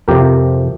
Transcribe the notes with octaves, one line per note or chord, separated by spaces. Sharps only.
F2 C3 F3 G4 A#4